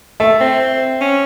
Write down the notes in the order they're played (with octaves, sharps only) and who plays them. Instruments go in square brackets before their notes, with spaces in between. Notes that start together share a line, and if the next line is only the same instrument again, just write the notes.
[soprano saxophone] A3 [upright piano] E5
[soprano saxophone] C4
C#4